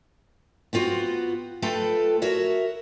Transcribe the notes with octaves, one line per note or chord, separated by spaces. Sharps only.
B3 C4 F4 F#4
A3 F4 A4 B4 G5
F#4 A#4 C#5 E5